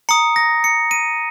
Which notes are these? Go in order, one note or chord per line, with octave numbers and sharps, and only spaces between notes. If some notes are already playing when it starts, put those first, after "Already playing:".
A#5 D#6 C#7
A#6
C#7
D#7